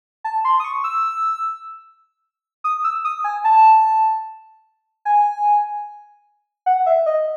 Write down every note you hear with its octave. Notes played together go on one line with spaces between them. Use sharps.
A5
C6
D#6
C#6
E6
D#6
E6
D#6
G#5
A5
G#5
F#5
E5
D#5